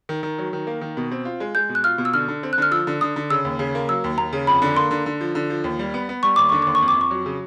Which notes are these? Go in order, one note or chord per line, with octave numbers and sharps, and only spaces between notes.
D#3
D#3
F#3
D#3
A#3
D#3
B2
C4
F4
G#3
G#3 G6
B2
F#6
F4 F6
B2
E6
D3 F6
D3
C4
F#6
D3 F6
F3 E6
D3
D3 D#6
D3
C#3 E6
D#2
C#3
A#3
F#3 E6
D#2
D#2 A#5
C#3
F2 B5
D3
A#3 C6
D3
D3
F3
D3
F3
D#2
G3
B3
B3
G3 C#6
D#2 D6
D3 C#6
D#2 D6
C#6
F2
D6
F2 C#6
F#3
C#3